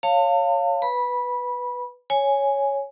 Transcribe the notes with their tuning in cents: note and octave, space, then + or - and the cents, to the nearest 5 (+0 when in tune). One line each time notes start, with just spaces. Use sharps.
C#5 +0 F5 +0 A5 +35
B4 +0 B5 -20
C#5 +0 G#5 +0